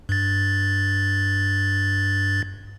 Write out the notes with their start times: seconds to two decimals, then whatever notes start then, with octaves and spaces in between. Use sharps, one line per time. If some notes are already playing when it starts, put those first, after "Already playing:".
0.09 G2 A6